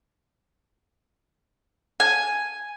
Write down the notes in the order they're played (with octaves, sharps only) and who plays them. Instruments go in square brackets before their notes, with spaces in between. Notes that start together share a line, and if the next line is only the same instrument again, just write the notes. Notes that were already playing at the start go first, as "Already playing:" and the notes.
[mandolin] G#5